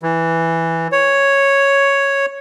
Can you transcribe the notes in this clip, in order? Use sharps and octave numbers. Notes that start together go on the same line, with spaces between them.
E3
C#5